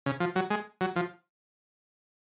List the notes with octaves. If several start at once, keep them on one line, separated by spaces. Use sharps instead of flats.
C#3
F3
F#3
G#3
F#3
F3